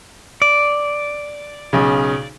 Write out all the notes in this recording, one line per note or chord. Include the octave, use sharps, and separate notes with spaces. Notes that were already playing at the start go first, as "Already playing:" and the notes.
D5
B1 C#3